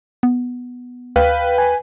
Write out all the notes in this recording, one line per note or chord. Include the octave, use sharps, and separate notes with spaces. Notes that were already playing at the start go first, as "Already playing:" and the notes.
B3
D2 B4 F5 G5
G#5